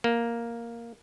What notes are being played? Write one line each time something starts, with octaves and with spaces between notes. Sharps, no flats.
A#3